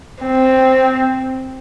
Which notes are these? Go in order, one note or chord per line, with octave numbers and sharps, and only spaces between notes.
C4